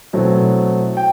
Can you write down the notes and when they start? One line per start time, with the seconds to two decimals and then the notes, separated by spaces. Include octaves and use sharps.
0.13 B2 F#3 A3 C4 E4
0.97 G5